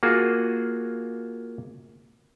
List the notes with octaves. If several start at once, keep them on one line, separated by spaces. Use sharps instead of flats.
A#3 F4 F#4 G#4